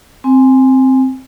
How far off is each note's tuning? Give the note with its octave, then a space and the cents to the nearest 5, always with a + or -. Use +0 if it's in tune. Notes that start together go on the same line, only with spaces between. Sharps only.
C4 +0 G#5 +0